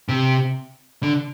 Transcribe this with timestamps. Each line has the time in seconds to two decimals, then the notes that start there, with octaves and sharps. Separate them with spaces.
0.09 C3
1.03 D3